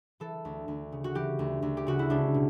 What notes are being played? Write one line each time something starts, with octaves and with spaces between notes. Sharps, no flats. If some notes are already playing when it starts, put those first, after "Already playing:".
E3 A4
D2
D2
C#3
F#4
E3 G4
D2
D2
G4
C#3 F#4
E4
C#2 D4
B2